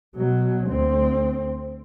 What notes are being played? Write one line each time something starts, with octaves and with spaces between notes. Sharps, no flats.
B2 F#3
D2 C4